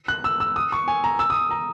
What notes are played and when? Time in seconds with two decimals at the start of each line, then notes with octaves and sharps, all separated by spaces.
0.08 F#6
0.24 E6
0.40 E6
0.56 D#6
0.72 C#6
0.88 G#5
1.04 A#5
1.19 E6
1.30 D#6
1.51 A#5